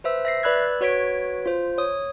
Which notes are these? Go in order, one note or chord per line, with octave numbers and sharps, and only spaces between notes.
B4 C5 E5 E6
E5 A#6 C7
B4 D5 B5 E6 F#6 G#6
F#4 B4 C#5 G#6 B6 D7
F4 C5
C#5 D#6